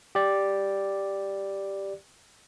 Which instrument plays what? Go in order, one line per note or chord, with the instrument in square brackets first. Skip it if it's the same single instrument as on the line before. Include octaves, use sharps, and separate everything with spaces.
[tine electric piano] G4 D5